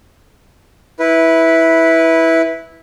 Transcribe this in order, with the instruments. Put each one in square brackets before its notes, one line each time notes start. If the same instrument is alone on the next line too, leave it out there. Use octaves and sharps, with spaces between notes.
[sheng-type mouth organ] E4 B4